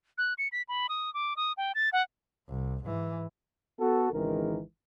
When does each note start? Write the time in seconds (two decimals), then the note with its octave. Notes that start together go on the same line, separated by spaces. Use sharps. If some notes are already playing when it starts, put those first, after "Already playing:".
0.18 F#6
0.38 C#7
0.52 B6
0.69 B5
0.89 D#6
1.14 D6
1.37 D#6
1.57 G5
1.75 A6
1.93 F#5
2.49 C2
2.84 G#2 E3
3.80 B3 F#4 A4
4.12 G#1 C#2 D#3 E3 G#3 A#4